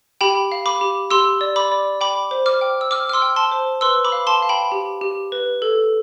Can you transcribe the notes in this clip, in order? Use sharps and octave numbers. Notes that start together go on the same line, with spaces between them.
G4 G5 B5
F5
B5 D6
G4
G4 C6 E6
D5
B5 D6
D5
G5 B5 D6
C5
D6 F6
G5
E6
G5 D6 F6
F6
C6 E6
G5
A5 C6
C5
B4 C6 E6
B5 D6
F5
A5 C6
F5
G5 B5
G4
G4
B4
A4